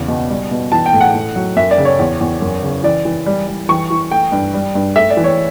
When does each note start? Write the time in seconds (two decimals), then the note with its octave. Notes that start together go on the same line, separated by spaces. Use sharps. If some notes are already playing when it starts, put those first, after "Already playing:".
Already playing: E2 C#3
0.08 B2
0.30 G3
0.51 B2
0.72 E3 A5
0.86 G5
0.93 A2
1.01 F#5
1.14 A2
1.36 F#3
1.56 F#2 E5
1.71 D5
1.78 C#3
1.85 C#5
1.99 E2
2.20 E2
2.42 F#2
2.63 C#3
2.84 E3 D5
3.05 E3
3.26 G3
3.48 G3
3.69 E3 C#6
3.90 E3
4.11 A3 G5
4.32 G2
4.54 G3
4.75 G2
4.96 A3 E5
5.10 D5
5.17 E3
5.24 C#5